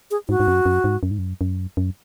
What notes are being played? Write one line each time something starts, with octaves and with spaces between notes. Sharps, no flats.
G#4
G#2 F#4
G#2
F#2
F#2
G#2
F#2
G#2
F#2
F#2
F#2